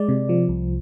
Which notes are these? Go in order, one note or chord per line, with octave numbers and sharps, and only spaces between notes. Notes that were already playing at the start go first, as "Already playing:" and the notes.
Already playing: G#3 D5
C3
F3
C2